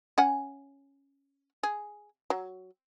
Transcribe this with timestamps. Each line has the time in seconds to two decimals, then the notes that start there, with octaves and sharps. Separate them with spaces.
0.18 C#4 F#5 G#5
1.63 G#4
2.30 F#3